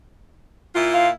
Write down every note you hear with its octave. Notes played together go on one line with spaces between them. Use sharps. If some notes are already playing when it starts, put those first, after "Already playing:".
A#2 E4 F4
F5